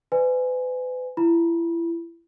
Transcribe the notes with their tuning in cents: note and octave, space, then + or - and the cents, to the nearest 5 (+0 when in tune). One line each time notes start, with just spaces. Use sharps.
B4 +35 D5 +35 G#5 +0
E4 +30 B5 -35